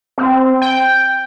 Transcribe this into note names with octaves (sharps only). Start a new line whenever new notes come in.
C4
G5